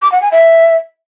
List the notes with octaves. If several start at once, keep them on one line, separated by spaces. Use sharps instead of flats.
D6
F#5
G#5
E5